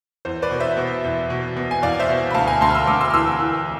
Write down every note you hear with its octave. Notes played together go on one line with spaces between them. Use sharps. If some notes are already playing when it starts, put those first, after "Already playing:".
E2 C5
B4 D5
B2
C5 E5
B2
E2
B2
B2
G#5
E2 D5 F5
C5 E5
B2
B5
D2 F5 A5
G#5 B5
D2 A5 C6
F6
C6 E6
D2 D6 F6
C6 E6
F6
E3 C6 E6
E3